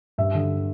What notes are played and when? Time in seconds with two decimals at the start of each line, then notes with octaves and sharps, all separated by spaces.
0.18 G2 E5
0.34 D3